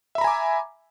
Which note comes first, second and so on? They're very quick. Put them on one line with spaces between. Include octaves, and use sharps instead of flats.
E5 B5 A#5 G#5 D6